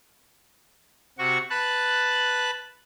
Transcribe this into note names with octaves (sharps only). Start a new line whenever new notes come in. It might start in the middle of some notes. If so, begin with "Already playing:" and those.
C3 F#4 C#6
B4 A5 F#6